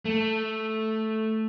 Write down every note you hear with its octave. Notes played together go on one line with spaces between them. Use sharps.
A3